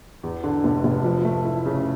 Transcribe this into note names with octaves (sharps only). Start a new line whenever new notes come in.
E2
D3
F1
F1
F3
A3
E4
C#3